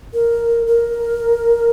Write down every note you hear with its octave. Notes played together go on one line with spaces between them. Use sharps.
A#4
A#4